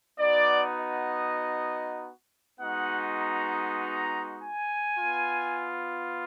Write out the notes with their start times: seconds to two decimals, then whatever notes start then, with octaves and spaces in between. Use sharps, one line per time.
0.19 B3 D#4 F#4 D5
0.79 D#5
2.60 G#3 B3 D#4 F#4 F#5
3.19 A#5
3.80 A#5
4.40 G#5
4.99 B3 F4